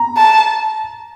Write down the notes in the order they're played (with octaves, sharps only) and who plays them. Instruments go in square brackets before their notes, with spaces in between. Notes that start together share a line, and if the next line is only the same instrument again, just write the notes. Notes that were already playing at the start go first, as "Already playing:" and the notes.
Already playing: [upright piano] A#5
[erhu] A5